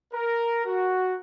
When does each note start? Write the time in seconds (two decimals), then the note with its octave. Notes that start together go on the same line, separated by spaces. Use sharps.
0.13 A#4
0.66 F#4